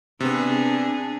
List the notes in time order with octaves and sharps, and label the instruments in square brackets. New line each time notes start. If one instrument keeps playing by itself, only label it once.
[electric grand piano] C3 B3 [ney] D4 [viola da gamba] G#4